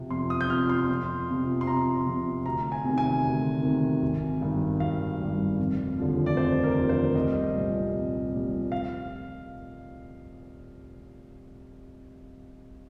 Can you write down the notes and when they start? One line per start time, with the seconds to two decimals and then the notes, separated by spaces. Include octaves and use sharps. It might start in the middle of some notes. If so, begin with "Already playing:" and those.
Already playing: F2 C3 F3
0.10 F2 C6
0.30 D#6
0.41 G6
0.50 C3 F3 F6
0.69 C6
0.89 F2
1.28 C3 F3
1.61 C6
1.67 F2 A#5
2.06 C3 F3
2.46 D2 A#5
2.72 G#5
2.84 C3 D#3
2.98 G#5
3.24 D2
3.63 C3 D#3
4.02 G#1
4.41 G2 D#3 G3
4.80 G#1 F5
5.20 G2 D#3 G3
5.59 F1
5.98 D#2 D3 F3
6.26 D5
6.37 F1 C5
6.64 A#4
6.76 D#2 D3 F3
6.89 C5
7.15 C2 D#5
7.55 A#2 G3
7.94 C2
8.33 A#2 G3
8.72 F5